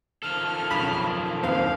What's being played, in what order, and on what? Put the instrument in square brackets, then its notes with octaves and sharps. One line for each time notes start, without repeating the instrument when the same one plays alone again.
[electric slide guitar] D#3 F3 A4 [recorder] F6
[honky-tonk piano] B1 [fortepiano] F2 C#3 B5
[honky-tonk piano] F#1 D#2 C4 [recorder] F5